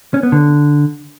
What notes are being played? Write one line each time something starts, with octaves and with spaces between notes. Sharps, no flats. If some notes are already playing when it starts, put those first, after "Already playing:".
C#4
B3
D3